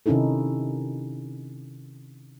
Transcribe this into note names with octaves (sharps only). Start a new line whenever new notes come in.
C3 D#3 C#4 D#4 E4 A4